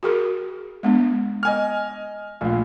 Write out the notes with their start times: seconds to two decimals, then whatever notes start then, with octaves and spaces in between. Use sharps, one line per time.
0.03 F#4 G#4 A#4
0.83 G#3 B3 D4
1.43 D#5 G#5 F6
2.41 A#1 A3 F4